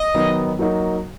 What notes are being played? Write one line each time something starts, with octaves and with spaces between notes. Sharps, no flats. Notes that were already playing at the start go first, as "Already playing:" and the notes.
Already playing: D#5
D#3 F#3 B3 D#4
F#3 A#3 D#4 F#4